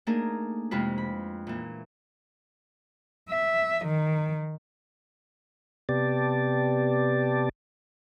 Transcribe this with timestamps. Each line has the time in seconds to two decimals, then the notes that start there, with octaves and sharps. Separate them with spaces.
0.07 A3 A#3 D4 D#4 G#4 A#4
0.71 F2 C3 G#3 E4 F4 B4
0.98 B5
1.47 A#2 E3
3.30 E5
3.85 D#3
5.89 C3 B3 G4 D5 A5